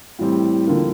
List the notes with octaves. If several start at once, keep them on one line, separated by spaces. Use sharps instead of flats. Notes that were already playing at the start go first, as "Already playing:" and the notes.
A2 E3 G3 C4
D3 F3 A#3